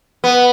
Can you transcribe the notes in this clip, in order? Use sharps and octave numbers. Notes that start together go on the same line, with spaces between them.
B3